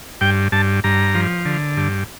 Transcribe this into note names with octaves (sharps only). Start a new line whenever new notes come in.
G2 G5
G2 A5
G2 A#5
F3
D3
G2